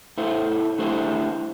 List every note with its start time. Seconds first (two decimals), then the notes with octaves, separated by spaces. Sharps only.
0.18 A2 A3 E4 C5
0.78 D3 A3 E4 G4 C5